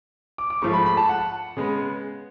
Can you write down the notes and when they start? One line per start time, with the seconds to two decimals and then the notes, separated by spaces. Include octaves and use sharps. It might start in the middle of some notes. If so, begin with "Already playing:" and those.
0.38 D6
0.50 D6
0.62 G#2 F3 A3 C#6
0.73 B5
0.86 B5
0.97 A5
1.09 F#5
1.57 C#3 G#3 B3